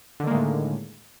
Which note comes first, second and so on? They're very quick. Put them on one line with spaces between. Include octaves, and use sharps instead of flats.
D3 D#3 A#3 G#3 A2